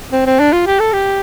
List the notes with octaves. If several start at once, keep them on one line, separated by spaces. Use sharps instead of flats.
C4
C4
D4
F4
G4
A4
G4